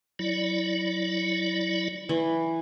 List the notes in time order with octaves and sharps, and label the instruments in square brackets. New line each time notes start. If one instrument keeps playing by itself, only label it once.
[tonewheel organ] F#3 E4 D5
[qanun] E3